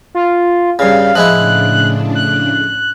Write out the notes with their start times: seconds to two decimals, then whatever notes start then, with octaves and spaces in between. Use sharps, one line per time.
0.15 F4
0.79 G2 C#3 F5 B5 G6 A6
1.15 A2 C#3 F3 G#3 D4 E4 F#6
2.15 F#6